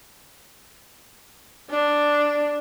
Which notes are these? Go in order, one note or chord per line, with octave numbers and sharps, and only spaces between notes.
D4